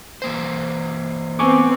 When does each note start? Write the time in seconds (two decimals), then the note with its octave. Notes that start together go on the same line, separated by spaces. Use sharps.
0.22 E3 A#3 C5
1.39 B3 C4 G#5 C#6 D6